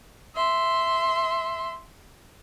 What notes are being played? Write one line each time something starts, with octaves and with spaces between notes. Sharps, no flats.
E5 C6